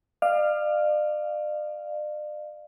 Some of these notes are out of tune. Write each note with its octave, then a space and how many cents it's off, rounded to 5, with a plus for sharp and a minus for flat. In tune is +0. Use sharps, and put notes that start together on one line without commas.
D5 +40 F5 -5